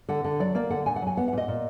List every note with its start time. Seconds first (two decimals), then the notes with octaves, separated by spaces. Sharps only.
0.09 D3 F#5
0.24 D3
0.40 F#3 D5
0.55 A#3 D5
0.70 D3 F#5
0.86 A#2 G#5
0.96 F#5
1.02 F#3 G#5
1.17 B3 F#5
1.28 F#5
1.33 A#2 D#5
1.48 A#2